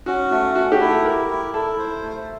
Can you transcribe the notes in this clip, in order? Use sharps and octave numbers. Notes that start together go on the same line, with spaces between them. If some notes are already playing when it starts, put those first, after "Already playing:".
C#4 F#4
A3 F#4
A3 F#4
G4
E4
A4
G4 A#4
E4
E4 A4
C5
A3